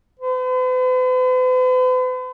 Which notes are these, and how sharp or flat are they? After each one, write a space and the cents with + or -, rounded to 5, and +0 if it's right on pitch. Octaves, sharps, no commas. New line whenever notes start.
B4 +45